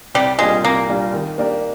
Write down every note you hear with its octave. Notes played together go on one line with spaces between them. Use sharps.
C2 G3
A#2 G3 G#3 D4 F4
C2 A#3
A#2 G3 D4 F4
D#3
A#3 D4 G4 A#4